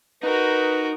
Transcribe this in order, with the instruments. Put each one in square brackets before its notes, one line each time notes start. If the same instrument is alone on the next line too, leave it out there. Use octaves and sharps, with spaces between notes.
[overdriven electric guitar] D#4 [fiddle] F#4 A#4 [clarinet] B4